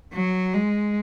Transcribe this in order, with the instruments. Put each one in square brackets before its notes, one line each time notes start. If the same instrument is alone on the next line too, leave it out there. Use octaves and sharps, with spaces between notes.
[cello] F#3
G#3